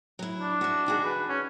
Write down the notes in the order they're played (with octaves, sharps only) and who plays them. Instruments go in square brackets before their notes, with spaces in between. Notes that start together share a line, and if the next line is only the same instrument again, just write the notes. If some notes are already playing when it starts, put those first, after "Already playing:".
[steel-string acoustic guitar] F#3 E4
[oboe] D4
[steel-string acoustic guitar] F#4 E5
D#3 F#4 G#4
[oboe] B4
C#4